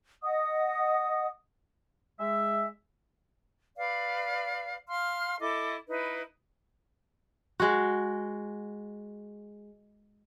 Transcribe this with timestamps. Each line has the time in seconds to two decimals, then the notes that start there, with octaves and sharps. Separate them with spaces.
0.23 D#5 F#5 D#6
2.20 G#3 E5
3.77 B4 D5 F5
4.89 F5 C6 F6
5.40 E4 A4 D#5 D6
5.88 D#4 E4 B4
7.60 G#3 F#4